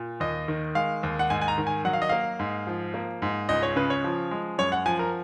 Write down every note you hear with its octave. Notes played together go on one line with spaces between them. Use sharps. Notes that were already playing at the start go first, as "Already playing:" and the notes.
Already playing: A#2
D#2 D#5
D#3
G#3 F5
D#2
F#5
G#2 G#5
G#5
A#5
D#3
G#5
F#3 F#5
F5
D#5
A#3 F5
G#2
F3
A#3
G#2
C#2 D#5
C#5
C#3 B4
C#5
F3
G#3
F#2 C#5
F#5
F3 G#5
A#4